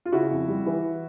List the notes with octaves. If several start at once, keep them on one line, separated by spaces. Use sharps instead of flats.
F4
C#3 E4 F#4
F2
G3
E3